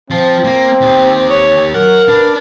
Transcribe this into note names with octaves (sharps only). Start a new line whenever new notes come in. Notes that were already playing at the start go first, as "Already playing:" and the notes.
F3 C4
A#3
D#2 G4
C#5
F#3 A#4 F#5
D4 B4